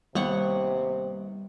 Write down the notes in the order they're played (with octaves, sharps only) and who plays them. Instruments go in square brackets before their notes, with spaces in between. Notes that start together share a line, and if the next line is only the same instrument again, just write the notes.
[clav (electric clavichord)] D#2 [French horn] C3 [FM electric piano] G3 [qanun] B3 C#5 F#5